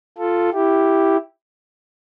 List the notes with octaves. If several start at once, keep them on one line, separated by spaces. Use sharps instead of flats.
F4 A4
E4 G4